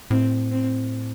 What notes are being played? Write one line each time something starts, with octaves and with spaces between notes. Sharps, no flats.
A2 C4
C4